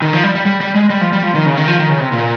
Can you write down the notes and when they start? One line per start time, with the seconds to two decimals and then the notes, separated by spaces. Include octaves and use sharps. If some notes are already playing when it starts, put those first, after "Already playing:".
0.02 D#3
0.13 F3
0.24 G3
0.35 G3
0.46 G3
0.61 G3
0.75 G#3
0.90 G3
1.01 F3
1.13 G3
1.23 F3
1.35 D#3
1.46 C#3
1.57 D#3
1.68 F3
1.79 D#3
1.89 C#3
2.00 C3
2.12 A#2